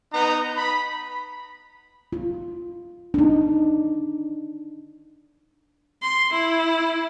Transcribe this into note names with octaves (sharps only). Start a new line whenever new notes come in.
B3 D#4 A#5
B5
F4
D4 D#4
C6
E4